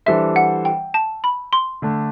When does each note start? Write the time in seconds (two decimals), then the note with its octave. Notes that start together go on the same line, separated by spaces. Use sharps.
0.06 E3 G3 D4 A4 C5 E5
0.36 F#5
0.65 G5
0.94 A5
1.24 B5
1.53 C6
1.82 D3 A3 D4